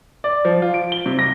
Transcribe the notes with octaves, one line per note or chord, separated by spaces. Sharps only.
D5
F3
F4
D7
G7
C3
A#6